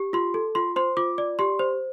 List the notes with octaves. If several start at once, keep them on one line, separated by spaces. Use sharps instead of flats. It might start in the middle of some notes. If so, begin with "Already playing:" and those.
Already playing: G4
F4 C6
A4
F4 C6
C5 C6
F4 D6
D5
G4 C6
C5